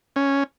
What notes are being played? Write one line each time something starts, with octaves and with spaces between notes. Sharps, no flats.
C#4